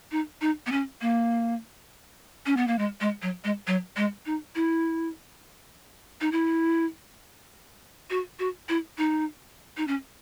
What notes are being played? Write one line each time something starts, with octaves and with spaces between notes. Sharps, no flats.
D#4
D#4
B3
C#4
A#3
C#4
B3
A#3
G#3
G#3
F#3
G#3
F#3
G#3
D#4
E4
D#4
E4
F#4
F#4
E4
D#4
D#4
C#4